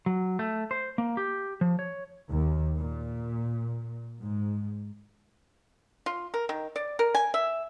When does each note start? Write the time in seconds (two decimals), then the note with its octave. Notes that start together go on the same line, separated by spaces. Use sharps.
0.06 F#3
0.39 A3
0.71 C5
0.98 A#3
1.17 G4
1.61 F3
1.79 C#5
2.28 D#2
2.78 A#2
4.20 G#2
6.06 F4
6.34 A#4
6.49 D#3
6.76 D5
6.99 A#4
7.15 G#5
7.34 E5